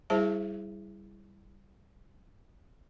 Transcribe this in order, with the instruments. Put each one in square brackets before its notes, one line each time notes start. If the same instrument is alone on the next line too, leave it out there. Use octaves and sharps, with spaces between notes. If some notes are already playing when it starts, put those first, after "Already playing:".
[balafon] G3 E4 G#4 C5 E5 A5